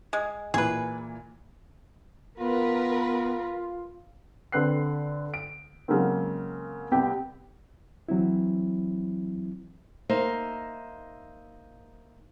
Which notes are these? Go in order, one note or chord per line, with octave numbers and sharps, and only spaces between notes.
G#3
A#2 E3 G#4 B4
B3 F4 A#4 B4
D3 C4 B4 F#6 C7
D7
C#3 F#3 G#3 A#3 C4
C2 B3 G4
E3 F#3 C4 E4
A#3 D#4 C5 E5